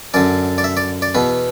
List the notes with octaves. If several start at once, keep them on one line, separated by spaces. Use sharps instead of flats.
F#2 D3 D5
D5
E5
D5
D5
E2 B2 B4